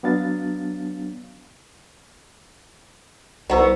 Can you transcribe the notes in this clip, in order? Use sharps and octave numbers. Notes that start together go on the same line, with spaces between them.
F#3 B3 D4 F5 A6
C2 B3 F#4 C5 A#5 E6